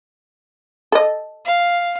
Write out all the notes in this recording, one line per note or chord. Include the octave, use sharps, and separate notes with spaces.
A4 D#5
F5